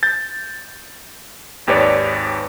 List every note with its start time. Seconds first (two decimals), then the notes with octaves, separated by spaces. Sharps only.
0.03 G6 A6
1.67 G#1 D#2 G4 B4 C#5 D5